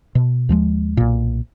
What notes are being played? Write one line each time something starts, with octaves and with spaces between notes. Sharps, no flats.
B2
D#2 F3 G#3
B1 A#2